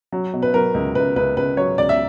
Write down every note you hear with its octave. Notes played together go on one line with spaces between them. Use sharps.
F#3
B2
B4
F#3 A#4
C#2
C#2 B4
C#2 B4
C#2 B4
F#3 C#5
C#2 D5
E5